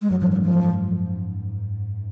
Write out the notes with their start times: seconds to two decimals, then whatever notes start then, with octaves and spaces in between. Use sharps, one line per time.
0.02 G#3
0.10 F#2 F#3
0.21 G#2 F3
0.32 F#2 F3
0.42 F3